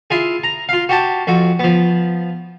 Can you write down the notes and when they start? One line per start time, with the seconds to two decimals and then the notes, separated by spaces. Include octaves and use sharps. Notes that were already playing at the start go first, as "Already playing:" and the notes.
0.10 E4 F4 G#4
0.44 A#5
0.69 F4 F5
0.89 F#4 G4 A5
1.27 F2 F#4
1.59 F3 B3